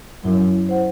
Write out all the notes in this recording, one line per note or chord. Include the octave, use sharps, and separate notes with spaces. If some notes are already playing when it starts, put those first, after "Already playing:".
F#2 E4
C5 F#5